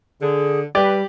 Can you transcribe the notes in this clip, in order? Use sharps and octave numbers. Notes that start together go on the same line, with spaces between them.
D3 G#4
G3 G4 B4 D5